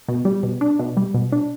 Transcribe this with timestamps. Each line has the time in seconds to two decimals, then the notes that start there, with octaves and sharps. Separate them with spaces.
0.08 B2
0.25 G3
0.43 B2
0.61 D4
0.79 B2
0.97 G3
1.14 B2
1.32 D4